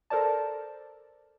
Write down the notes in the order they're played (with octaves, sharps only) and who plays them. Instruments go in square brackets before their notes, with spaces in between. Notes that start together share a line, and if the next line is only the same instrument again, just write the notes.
[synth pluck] A4 A#4 C5 D5 A5